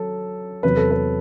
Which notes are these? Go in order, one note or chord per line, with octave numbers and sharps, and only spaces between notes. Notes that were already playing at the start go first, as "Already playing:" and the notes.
Already playing: F#3 A4
E2 C3 F#3 B4
A4
B4